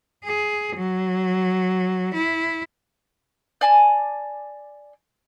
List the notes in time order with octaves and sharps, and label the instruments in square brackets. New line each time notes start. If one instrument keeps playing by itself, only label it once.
[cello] G#4
F#3
E4
[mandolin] D5 G#5 A5